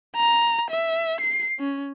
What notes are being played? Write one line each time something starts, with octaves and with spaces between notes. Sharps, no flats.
A#5
E5
C7
C#4